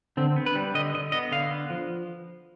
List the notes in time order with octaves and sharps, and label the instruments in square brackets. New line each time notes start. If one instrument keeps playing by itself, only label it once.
[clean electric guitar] D3 C4
B3
B4
G3
D3 D#5
D3 D#5
B3 D#5
D3 F5
B3
F3